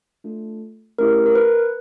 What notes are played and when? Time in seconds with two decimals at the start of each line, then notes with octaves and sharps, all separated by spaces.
0.24 A3 D4 F4 A4
0.98 A3 C#4 E4 G4 A#4
1.26 A#4
1.36 B4